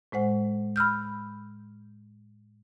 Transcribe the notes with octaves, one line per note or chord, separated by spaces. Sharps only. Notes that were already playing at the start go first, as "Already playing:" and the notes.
A2 G#3 C5 F#5
B5 E6 F6 G6